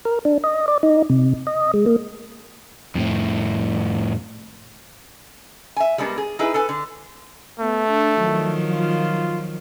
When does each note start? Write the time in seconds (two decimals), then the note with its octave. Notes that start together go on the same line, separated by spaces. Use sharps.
0.05 A#4
0.25 D4
0.44 D#5
0.68 D5
0.83 D#4
1.10 C3
1.47 D#5
1.74 G#3
1.86 A#3
2.95 F2 A2
5.76 E5 G#5
5.98 G3 G#3 B3 D4 A#4
6.18 G#4
6.39 D#4 E4 G#4 B4
6.54 A4 B4 G#5
6.69 D3
7.60 A3 B3
7.89 D4
8.20 D#3 F3 F#3
8.71 F4